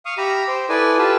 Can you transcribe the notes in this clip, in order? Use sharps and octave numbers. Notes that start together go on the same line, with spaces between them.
F5 C#6 D#6
G4 E5 A#5 B5
C5 G5
E4 A4 B4 D5 G#5 D#6
F4 G4 A4 B4 E5 A5